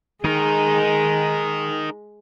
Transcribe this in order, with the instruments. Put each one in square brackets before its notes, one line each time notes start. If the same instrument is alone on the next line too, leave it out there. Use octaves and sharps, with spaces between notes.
[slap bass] D#3 [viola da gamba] G#3 [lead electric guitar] D#4 A#4